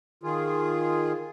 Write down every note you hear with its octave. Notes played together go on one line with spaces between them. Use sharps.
D#3 F4 G#4